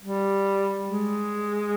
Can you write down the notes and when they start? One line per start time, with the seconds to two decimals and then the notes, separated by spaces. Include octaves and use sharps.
0.02 G3
0.88 G#3